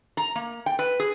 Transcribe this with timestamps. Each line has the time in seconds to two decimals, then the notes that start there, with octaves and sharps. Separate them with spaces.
0.17 A#5
0.35 A#3
0.66 G5
0.79 B4
1.00 G#4